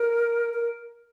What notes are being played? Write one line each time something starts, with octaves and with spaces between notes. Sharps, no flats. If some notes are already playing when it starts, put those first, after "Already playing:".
Already playing: A#4
A#4